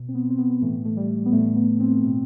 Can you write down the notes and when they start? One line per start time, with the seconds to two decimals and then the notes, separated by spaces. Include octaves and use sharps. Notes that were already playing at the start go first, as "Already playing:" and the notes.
Already playing: B2
0.08 C4
0.14 B3
0.30 C4
0.38 B3
0.50 B3
0.61 A2 E3 A3
0.85 A3
0.97 G3
1.26 B3
1.32 A2 E3 A3
1.56 B3
1.80 C4
2.03 B2